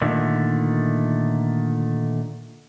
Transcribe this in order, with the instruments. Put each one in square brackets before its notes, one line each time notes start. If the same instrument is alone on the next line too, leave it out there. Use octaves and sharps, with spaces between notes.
[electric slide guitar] A#2 D3 D#3 A3